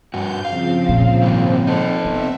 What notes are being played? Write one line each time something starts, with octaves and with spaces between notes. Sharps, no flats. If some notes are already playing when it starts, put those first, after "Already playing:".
G2 F#4 G6
C#3 F3 C4 F5
A#2
G#2 D#3 G3
D#4 A4
B3 C4 E5